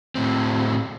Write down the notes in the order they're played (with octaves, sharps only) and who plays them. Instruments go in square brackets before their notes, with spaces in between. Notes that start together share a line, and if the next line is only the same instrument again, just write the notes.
[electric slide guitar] A2 C4